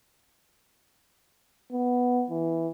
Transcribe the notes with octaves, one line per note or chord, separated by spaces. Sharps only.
B3
E3